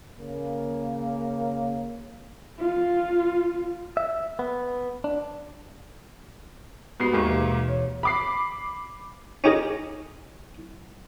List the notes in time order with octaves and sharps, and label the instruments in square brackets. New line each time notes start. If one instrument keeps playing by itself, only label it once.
[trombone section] C#3 A#3
[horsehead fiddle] F4
[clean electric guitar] E5
B3
D4
[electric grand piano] G#2 B3 C7 [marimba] F#4 G4 B5
[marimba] D#2 G4 C#6 [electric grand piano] G#2 G#3 A#3
[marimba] B2 E3
C#5
[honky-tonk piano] B5 D6 C7
[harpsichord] C#4 D#4 G4 G#4 A#4